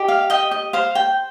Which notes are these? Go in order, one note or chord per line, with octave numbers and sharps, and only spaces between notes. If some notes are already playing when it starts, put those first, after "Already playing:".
Already playing: G4 D#5
F5
D#5 G5
D#5
C5 F5
G5